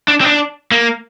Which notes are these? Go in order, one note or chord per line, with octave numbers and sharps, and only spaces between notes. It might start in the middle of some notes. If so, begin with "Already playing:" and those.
D4
C4
D4
A#3